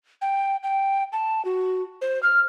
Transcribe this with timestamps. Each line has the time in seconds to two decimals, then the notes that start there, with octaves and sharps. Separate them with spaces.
0.22 G5
0.63 G5
1.13 A5
1.45 F#4
2.02 C5
2.23 F6